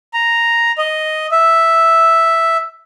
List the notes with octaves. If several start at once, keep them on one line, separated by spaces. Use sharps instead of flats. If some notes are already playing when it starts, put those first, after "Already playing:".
A#5
D#5
E5